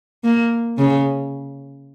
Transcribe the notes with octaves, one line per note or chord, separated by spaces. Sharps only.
A#3
C#3